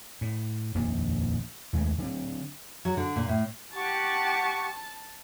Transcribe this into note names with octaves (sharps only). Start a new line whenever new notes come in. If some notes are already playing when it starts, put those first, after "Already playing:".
A2
D#1 A#1 F2 A#3
D#2 G#3 A3
D3 F#3 G#3 C4
F#3
D3
A#2
A2
G4 F#5 A5 C#6